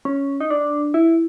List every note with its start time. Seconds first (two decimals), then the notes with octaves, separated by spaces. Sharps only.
0.05 C#4
0.40 D#4
0.50 D4
0.94 E4